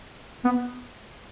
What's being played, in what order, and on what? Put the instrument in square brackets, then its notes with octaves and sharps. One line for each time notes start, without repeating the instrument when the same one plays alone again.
[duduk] B3